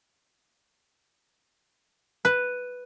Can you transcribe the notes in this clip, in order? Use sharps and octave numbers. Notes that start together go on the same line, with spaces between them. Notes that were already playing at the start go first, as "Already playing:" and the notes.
B4